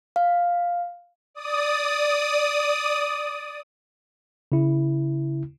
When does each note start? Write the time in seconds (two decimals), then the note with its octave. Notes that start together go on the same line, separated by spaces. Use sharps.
0.16 F5
1.34 D5 D#6
4.52 C#3 E4